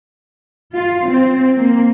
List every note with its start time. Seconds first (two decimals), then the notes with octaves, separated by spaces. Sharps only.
0.74 F4
1.08 C4
1.59 A#3